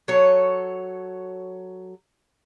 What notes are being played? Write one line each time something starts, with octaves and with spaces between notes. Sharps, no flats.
F#3 A4 C#5